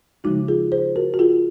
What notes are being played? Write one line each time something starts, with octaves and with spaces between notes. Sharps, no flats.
C#3 F3 G#3 D#4 F#4
F4 G#4
G#4 C5
F#4 A#4
F#4
F4 G#4